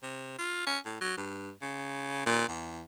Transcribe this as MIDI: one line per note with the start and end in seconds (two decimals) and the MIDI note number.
0.03 0.38 48
0.39 0.63 65
0.67 0.78 61
0.85 0.98 45
1.01 1.17 54
1.17 1.50 43
1.61 2.23 49
2.26 2.45 46
2.48 2.81 40